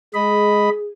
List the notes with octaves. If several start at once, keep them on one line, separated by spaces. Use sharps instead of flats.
G#3 G#4 D#5 B5